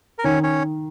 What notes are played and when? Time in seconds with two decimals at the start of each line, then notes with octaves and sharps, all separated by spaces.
0.19 A#4
0.24 D#3 C#4 C#5
0.43 C#4 C#5